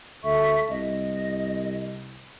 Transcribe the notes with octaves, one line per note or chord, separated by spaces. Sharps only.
D2 A4 E5 C#6
C2 D#5